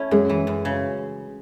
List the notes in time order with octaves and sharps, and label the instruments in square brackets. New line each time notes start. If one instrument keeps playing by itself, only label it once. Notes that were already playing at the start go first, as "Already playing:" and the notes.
Already playing: [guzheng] A3 C#4 E4
[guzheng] F#2 [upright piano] G#3 G#4
[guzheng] E3
F#2
C#3